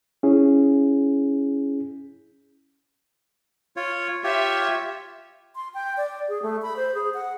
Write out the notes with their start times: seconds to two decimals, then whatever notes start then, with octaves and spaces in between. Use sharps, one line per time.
0.23 C#4 E4 G#4
3.76 F4 C#5
4.24 F4 G4 C#5 E5
5.55 C6
5.74 G5
5.97 D5
6.29 G#4
6.42 A3
6.62 B5
6.76 C5
6.95 G#4
7.14 F#5